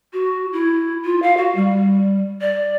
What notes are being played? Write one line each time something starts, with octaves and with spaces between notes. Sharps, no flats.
F#4
E4
F4
F5
F#4
G3
D5